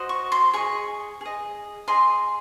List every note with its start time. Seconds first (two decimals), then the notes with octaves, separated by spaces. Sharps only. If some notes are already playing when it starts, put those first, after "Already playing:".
Already playing: F#4 C5 D#5
0.09 C#6
0.32 C6
0.54 G#4 D#5 C#6
1.21 G#4 D#5
1.88 G#4 D#5 C6